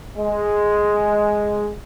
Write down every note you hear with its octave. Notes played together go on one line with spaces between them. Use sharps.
G#3